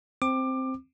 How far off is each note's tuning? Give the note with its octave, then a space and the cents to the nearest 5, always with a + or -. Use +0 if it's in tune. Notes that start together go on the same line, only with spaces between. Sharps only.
C4 +0 D6 +20